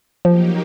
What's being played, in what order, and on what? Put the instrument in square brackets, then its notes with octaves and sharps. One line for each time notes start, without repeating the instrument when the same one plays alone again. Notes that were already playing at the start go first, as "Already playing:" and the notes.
[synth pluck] F3 [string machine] F#3 A#3 D#4 G4